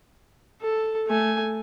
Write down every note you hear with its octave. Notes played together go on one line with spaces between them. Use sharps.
A4
A3 G#5